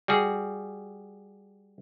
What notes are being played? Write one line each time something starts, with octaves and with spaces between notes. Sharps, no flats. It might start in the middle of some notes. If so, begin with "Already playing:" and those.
G3 F#4 G#4